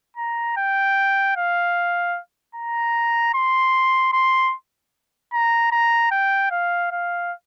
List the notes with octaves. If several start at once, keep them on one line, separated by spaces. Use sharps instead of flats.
A#5
G5
F5
A#5
C6
C6
A#5
A#5
G5
F5
F5